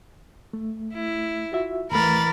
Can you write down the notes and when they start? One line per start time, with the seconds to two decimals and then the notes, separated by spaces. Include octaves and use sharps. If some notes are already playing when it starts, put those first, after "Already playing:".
0.53 A3
0.94 E4
1.52 F4 F#4 E5
1.91 D#2 E3 A3 A#4 B5 A6